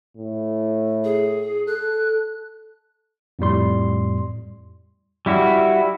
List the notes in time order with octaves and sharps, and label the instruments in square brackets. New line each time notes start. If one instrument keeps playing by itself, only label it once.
[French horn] A2
[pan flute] G#4
[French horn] A4 [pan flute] F#6
[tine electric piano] F2 A2 G3 C6
[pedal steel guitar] G3 E4 F#4